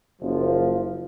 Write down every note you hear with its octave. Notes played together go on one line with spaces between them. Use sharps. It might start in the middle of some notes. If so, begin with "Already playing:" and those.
F#1 F3